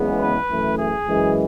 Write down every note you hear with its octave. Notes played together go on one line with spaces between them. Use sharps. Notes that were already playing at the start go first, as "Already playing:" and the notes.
Already playing: F#1 E2 C#3 G#3 B3
B4
F#2 E3 A3
G#4
F#2 E3 G#3